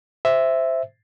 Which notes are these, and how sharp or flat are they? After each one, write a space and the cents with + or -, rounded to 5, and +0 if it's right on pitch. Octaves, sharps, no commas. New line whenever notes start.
C5 +0 E5 +0